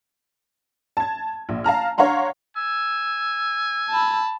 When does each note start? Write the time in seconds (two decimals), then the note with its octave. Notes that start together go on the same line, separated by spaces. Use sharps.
0.97 A5 G#6
1.49 A#1
1.64 F5 A5 A#5 F6
1.98 D4 C#5 F5 F#5 A#5 C6
2.56 G#5 E6
3.90 A5 B5